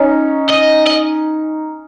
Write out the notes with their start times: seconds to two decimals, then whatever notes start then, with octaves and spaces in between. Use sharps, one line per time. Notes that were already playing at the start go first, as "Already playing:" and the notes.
Already playing: C#4 D#4
0.49 D#5
0.86 D#5